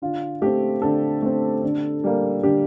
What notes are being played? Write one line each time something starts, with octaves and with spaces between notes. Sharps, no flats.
D3 F4
A3 C4 G4
D3 A4
A3 C4
D3
G3 A#3
D3 G4